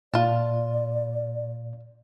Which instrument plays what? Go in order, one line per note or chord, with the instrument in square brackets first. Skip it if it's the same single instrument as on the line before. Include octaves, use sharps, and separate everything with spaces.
[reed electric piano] A#2 [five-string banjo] F4 A5 [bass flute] D5